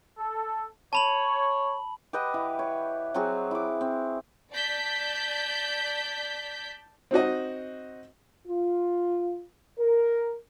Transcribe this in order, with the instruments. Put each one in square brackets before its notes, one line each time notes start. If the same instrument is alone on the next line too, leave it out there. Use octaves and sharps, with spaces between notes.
[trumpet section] A4
[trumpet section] C#5 [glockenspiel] A5 B5 F#7
[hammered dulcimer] G4 B4 D#5 F#5
E3
C#5
F#3 C4 F#4 G#4
E4 D6
C4
[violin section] D5 A5 G6 B6
[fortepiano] C4 D#4 F#4 D#5
[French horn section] F4
A#4